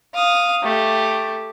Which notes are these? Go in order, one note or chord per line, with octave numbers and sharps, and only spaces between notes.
F5 D#6
A3 G4